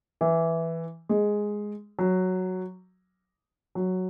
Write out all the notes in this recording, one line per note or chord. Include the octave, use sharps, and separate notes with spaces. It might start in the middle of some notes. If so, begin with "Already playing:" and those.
E3
G#3
F#3
F#3